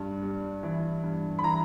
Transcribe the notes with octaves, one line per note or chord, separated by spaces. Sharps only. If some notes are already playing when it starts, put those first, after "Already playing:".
Already playing: G2
G3
E3
G2
B5
E3 A#5